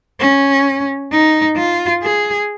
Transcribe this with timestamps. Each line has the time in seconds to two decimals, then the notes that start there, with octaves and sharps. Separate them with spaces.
0.20 C#4
1.12 D#4
1.57 F4
2.03 G#4